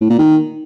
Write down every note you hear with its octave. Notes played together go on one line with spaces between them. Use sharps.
A2
A#2
D#3